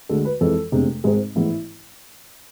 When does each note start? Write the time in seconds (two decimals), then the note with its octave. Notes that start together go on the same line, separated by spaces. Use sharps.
0.09 D2 D3 G#3 A4
0.25 B4
0.41 F2 E3 G#3 A4
0.72 F1 E2 C3 G#3 D4
1.04 G#1 G#2 G#3 C4 G#4
1.35 A1 G#2 E3 G#3 B3 E4